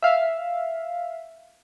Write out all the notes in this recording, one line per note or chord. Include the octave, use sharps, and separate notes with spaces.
E5 F5